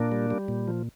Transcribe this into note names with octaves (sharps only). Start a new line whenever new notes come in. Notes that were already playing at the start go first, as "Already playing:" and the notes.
Already playing: A#2 A#3 D4
G3
G3
A#2
F3